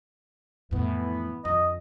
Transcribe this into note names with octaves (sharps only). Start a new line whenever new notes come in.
F2 A2 E3 B3
F2 D3 D#5